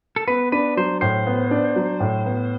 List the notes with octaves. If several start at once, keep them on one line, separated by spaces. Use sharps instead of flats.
A4
B3 B4
D4 B4
F#3 C5
A2 C5
B3
D4
F#3
A2
B3